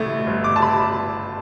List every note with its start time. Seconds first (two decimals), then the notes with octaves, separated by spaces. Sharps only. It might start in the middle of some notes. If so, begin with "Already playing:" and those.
Already playing: A1 A2 A3
0.26 G1
0.44 D6
0.56 A5
0.62 B5